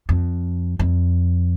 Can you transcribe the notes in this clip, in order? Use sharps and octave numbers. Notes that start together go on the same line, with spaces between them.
F2
F2